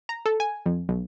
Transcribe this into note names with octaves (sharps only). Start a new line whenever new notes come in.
A#5
A4
G#5
F2
B1